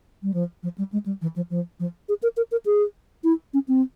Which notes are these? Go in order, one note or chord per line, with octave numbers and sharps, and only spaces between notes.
G3
F3
F3
G3
G#3
G3
E3
F3
F3
F3
G#4
A#4
A#4
A#4
G#4
E4
C#4
C4